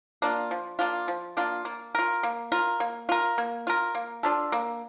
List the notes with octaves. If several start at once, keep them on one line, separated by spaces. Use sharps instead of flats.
A#3 D4 F4
F3
A#3 D4 F4
F3
A#3 D4 F4
A#3
F4 A#4
A#3
F4 A#4
A#3
F4 A#4
A#3
F4 A#4
A#3
D4 F4 A4
A#3